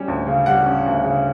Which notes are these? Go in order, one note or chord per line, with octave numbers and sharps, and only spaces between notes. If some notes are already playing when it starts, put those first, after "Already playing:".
Already playing: G3 C#4
D2
C#3
G3 F#5
C#4
D2
C#3